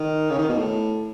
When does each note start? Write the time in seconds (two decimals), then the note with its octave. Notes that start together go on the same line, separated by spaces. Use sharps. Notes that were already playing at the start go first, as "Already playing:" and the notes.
Already playing: D#3
0.30 C#3
0.38 D#3
0.49 B2
0.58 A2